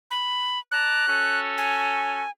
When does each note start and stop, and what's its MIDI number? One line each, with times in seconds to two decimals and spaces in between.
0.11 0.59 83
0.71 1.06 74
0.71 1.06 81
0.71 1.06 82
0.71 1.40 90
1.07 2.22 61
1.07 2.22 66
1.07 2.22 69
1.58 2.30 80